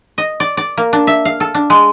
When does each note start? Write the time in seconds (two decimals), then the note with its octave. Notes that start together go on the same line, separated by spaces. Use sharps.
0.18 D#5
0.40 D5
0.57 D5
0.78 A#3
0.93 D4
1.07 E5
1.25 F5
1.40 A4
1.55 D4
1.70 G#3